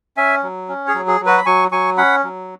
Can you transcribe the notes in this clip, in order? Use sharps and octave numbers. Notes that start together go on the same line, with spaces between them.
C#4 E5 G#5
F#3
C#4
G#4 C#5
F#3
G#4
F#3
F#4 B4
B5
F#3 G#5 C#6
F#3 G#5 C#6
C#4 F#5 B5
F#3